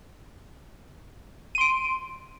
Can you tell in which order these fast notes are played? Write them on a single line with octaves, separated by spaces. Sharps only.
D#7 C6 D7